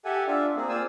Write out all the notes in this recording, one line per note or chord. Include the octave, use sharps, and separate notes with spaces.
G4 A4 E5 F#5 G#5
D4 F4 D5 E5
A#3 C4 G#4
F4 C5 D5 G#5 E6